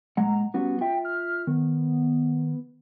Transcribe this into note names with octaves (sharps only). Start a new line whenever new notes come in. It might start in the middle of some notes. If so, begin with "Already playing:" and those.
A#2 G#3 F#5 A#5
G3 B3 C#4 F#4
F4 E5 G5
F6
D#3 B3